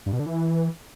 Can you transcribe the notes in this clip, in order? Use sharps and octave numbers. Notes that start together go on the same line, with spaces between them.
G2
B2
D3
E3